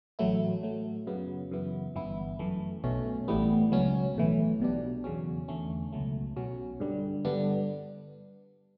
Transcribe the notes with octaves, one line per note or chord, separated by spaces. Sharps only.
A1 A2 F#3 A3 E4
A2 F#3 A3
F#2 C#3 F#3 B3
F#2 C#3 E3 B3 E4
G1 G2 E3 B3 E4
F#2 E3 A3
B1 B2 A3 C#4
A1 A2 E3 G3 B3
C#2 B2 F#3 C#4
B1 A2 E3
B1 B2 G3 D4
E2 C#3 F#3 C#4
E2 D3 A3 C#4
C#2 B2 F#3 A3
B1 B2 F#3 C#4
G2 D3 G3
G2 D3 G3 B3 D4